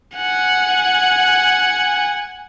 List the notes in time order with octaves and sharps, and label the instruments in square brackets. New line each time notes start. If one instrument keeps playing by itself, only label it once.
[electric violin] F#5 G#5